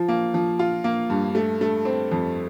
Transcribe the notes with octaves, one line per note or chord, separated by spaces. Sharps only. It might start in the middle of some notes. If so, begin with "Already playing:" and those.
Already playing: F3
A#3
F3
F4
A#3
G2
A3
A3
C4
F2